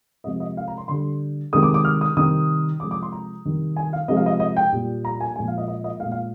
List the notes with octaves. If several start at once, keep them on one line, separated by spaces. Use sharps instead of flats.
C3 F3 G#3 D#5
D#5
F5
A#5
C6
D3 G3 C6
C3 D#3 G#3 D#6
D6
D6
F6
D#6
C3 D#3 G3 D#6
C3 F3 G#3 D6
D6
C6
A#5
C3 D#3 G3
G#5
F5
C3 F3 G#3 D#5
F5
D#5
D#5
G5
A#2 G3
A#5
G#5
A#2 F3 G#3 G#5
F5
D#5
D#5
D#5
G#3 F5
A#2
F5